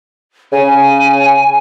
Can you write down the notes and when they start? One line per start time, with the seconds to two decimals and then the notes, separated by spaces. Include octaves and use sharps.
0.52 C#3 G#5